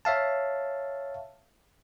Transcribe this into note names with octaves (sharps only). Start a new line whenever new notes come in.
C#5 E5 F5 A5